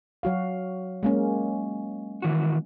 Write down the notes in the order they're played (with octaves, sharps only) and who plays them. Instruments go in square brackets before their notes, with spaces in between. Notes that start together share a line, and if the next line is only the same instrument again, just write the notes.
[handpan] F#3 F#4 F5
G#3 A#3 C#4
[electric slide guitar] D#3 E3 F#4